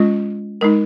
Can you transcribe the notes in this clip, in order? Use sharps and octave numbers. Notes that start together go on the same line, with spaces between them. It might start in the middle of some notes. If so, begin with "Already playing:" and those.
Already playing: G#3 C#4 F4
G#3 D#4 A#4